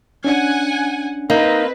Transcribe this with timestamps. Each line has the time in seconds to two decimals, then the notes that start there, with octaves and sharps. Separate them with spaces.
0.24 C#4 D4 F#5 G#5
1.30 A#3 C4 D#4 B4